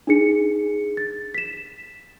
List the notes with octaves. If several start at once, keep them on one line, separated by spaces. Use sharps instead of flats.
D4 D#4 G#4 C#7
A6
B6 E7